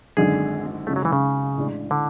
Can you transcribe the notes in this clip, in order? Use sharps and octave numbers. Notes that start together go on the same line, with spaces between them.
G#1 F#2 D3 G#3 D4 G#4
F#2 C#3 G#3 A3
F#3
E3
C#3
A1 A2 G#3 D4
D3